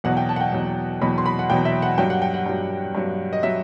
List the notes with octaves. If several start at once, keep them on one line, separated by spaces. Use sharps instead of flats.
E2 B2 F#3 F#5
G5
A5
F#5
G5
E2 B2 F#3
E2 B2 F#3 B5
C6
B5
F#5
E2 B2 F#3 G5
E5
F#5
G2 F#3 G5
F#5
G5
F#5
G2 F#3
G2 F#3
D#5
F#3 E5